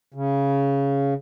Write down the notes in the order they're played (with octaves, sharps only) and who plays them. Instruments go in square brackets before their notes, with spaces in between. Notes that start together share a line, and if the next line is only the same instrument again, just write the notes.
[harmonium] C#3